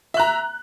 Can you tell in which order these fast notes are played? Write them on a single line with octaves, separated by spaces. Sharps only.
E5 F#6 A#5